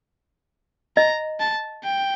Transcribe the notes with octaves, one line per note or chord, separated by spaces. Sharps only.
D#5 A#5
A5
G5